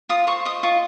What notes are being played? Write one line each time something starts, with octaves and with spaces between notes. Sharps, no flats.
F4 D#6
C5 C#6
D#5 D#6
F4 C#6